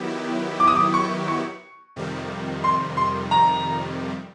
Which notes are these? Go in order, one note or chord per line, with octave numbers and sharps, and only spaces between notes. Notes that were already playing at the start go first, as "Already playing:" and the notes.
Already playing: D#3 F#3 B3 E4 G4
D6
D#6
D6
C#6
C#6
F2 C3 D#3 G3
C6
C6
A#5